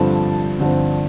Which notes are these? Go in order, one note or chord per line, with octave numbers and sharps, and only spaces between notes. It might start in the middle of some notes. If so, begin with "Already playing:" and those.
Already playing: G2 D3 F3 C4 A4 A5
G2 D3 F3 C4